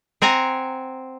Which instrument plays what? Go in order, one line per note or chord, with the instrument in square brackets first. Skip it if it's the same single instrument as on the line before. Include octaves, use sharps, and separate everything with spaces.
[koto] C4 F#5 G#5 A#5